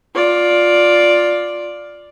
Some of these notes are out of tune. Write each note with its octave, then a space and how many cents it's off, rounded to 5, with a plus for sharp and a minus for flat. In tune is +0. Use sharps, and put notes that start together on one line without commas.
F4 +10 D5 +0